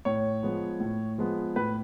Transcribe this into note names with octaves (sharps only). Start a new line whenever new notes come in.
A2 C#5
F3 G#3 B3
A2
F3 G#3 B3
A2 B4